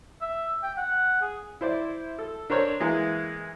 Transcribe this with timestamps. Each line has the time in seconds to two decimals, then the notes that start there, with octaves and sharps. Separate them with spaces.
0.21 E5
0.63 G5
0.77 F#5
1.22 G#4
1.61 E4 C5 D5
2.19 A4
2.50 D4 A#4 C5 C#5
2.80 E3 G#3 A#3